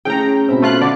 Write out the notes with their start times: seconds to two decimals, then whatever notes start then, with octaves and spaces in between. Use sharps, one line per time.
0.05 A3 C#4 E4 G#4 G5 A#5
0.49 B2 C4 E5 B5
0.62 A3 F4 F#6
0.81 D3 D5